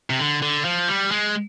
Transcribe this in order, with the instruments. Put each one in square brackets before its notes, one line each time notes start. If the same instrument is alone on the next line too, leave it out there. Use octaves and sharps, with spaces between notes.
[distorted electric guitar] C3
D3
D3
F3
G3
G#3